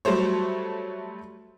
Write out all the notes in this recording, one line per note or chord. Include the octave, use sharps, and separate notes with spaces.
F#3 G3 A3 C5 C#5